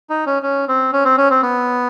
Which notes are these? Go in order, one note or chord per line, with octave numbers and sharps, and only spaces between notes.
D#4
C#4
C#4
C4
C#4
C4
C#4
C4
B3